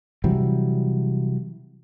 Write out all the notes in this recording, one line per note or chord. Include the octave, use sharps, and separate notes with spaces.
C3 E3 F#3 G3